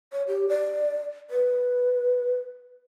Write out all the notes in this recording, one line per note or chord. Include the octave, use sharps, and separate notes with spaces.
C#5
G4
D5
B4